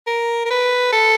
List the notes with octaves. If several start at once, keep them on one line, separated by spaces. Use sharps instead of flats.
A#4
A#4
B4
A4